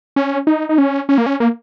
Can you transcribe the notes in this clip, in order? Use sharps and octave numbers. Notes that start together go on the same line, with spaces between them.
C#4
D#4
D#4
C#4
C#4
A#3
C#4
A#3